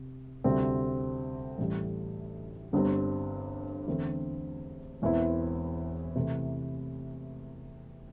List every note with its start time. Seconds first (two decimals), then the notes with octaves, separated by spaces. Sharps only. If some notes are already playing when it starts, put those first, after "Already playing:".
Already playing: C3
0.44 D2 C3 G3 C4
1.58 A1 A2 G3
2.73 G1 G2 G3 C4
3.88 E2 D3 A3 C4
5.02 E1 E2 E3 C4 E4
6.16 C3 E3 A3